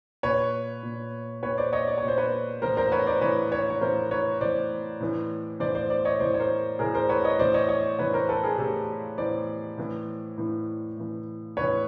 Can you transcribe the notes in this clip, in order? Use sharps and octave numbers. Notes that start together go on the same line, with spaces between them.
A#2 B4 C#5
A#2
A#2 B4 C#5
C5 D5
C#5 D#5
D5
A#2 C#5
C5
B4 C#5
A2 E3 A#4 C5
A#4 C5
B4 C#5
C5 D5
A2 E3 B4 C#5
B4 C#5
C#5
A2 E3 A#4 C5
B4 C#5
A2 E3 C5 D5
A2 E3
A2 E3 C5 D5
C5 D5
C5 D5
C#5 D#5
A2 E3 C5 D5
C#5
A#4 C5
A2 E3 G#4 A#4
A#4 C5
B4 C#5
C#5 D#5
A2 E3 C5 D5
C#5 D#5
C#5 D#5
A2 E3 B4 C#5
A#4 C5
A4 B4
G#4 A#4
A2 E3 G4 A4
A2 E3 C5 D5
A2 E3
A2 E3
A2 E3
A2 E3 B4 C#5